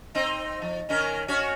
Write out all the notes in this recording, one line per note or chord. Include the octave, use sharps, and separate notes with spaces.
C4 D#4
F3
D#3 C#4 A#4
C#4 F#4 C#5